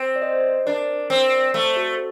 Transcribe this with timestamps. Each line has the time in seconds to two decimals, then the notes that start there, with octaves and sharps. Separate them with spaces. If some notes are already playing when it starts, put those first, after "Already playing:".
Already playing: C4
0.16 D5
0.22 C5 D#5
0.66 D4 A#4 D5
1.10 C4
1.54 A3
1.77 F#4 A4